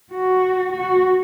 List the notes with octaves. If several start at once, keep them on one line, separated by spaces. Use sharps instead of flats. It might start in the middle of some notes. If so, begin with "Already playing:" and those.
F#4
F#4